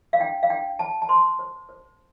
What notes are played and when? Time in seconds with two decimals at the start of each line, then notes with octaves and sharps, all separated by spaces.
0.13 F5
0.20 D4 G5
0.43 F5
0.50 D4 G5
0.79 C5 A5
1.02 A5
1.09 C5 C6
1.39 C5
1.69 C5